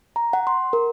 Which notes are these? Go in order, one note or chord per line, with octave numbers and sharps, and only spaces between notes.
A#5
F#5
C6
A#4